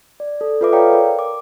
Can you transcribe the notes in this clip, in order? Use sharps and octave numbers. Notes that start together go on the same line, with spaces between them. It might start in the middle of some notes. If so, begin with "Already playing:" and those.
D5
A4
F4 A4 B4 E5 D6
C#5 D5 F5 G5 A#5
A#4
D6